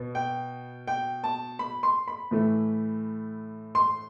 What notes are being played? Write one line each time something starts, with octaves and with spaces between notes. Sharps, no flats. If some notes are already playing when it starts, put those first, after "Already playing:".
Already playing: B2 B3
G5
G5
A5
B5
C6
B5
A2 E3 A3
C6